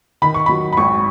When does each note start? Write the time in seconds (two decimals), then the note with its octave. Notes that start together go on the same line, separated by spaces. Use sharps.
0.22 D#3 B5
0.34 C#6
0.46 F#3 B5
0.73 B5
0.77 G#1 C#6